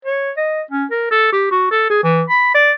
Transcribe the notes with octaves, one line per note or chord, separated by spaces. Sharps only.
C#5
D#5
C#4
A#4
A4
G4
F#4
A4
G#4
E3
B5
D5